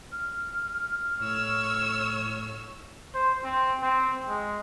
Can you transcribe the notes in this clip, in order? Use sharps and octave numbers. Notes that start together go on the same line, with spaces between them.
F6
A2 C#5 E6
C5
C4
C4
G#3